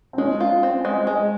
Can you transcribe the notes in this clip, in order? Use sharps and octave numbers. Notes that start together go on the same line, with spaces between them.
C4
G#3 C#4
F4
C4
G#3
G#3